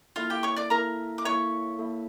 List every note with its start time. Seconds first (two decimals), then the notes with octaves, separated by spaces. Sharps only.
0.16 A#3 E4 F4 A4 E5 F5
0.30 G4 G5
0.43 C#5 C#6
0.56 D5 D6
0.70 A#3 E4 A4 A#4 E5 A#5
1.18 D6
1.25 A#3 E4 A4 C#5 E5 C#6
1.79 A#3 E4 A4 E5